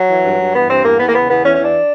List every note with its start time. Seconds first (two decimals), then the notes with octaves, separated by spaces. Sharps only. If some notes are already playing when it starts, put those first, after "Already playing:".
Already playing: F#3
0.08 E3
0.23 G2
0.38 G2
0.53 E3 B3
0.68 G2 C4
0.83 E2 A#3
0.98 E2 B3
1.08 A#3
1.13 C#3 B3
1.28 E2 B3
1.43 E3 C#4
1.53 C#4
1.58 E2
1.63 D4